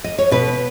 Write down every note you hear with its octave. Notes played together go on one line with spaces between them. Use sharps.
D#5
C#5
B2 B4